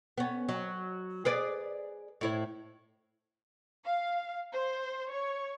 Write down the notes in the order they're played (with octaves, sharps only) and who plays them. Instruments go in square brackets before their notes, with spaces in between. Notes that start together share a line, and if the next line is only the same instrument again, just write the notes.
[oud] B3 C#4
F#3
G#4 B4 D5
A2 E4 C#5
[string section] F5
C5
C#5